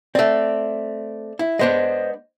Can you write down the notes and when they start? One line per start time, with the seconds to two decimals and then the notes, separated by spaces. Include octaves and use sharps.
0.15 A3 C4 D5
1.39 E4
1.59 G#3 B3 D4 C5 D#5